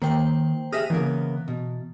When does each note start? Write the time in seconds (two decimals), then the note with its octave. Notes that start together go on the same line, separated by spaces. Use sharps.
0.02 D#3 A#3 C5 G5
0.72 G4 G#4 E5 D#6 F6 A#6
0.90 C#3 E3 A#3 B3
1.48 B2